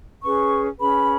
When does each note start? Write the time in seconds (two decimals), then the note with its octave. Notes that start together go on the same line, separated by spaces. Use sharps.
0.23 C#4 G#4 B4 C#6
0.79 C#4 G#4 B4 B5